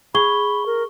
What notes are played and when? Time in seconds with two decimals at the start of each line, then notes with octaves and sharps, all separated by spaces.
0.15 G#4 B5 C#6 G7
0.66 A#4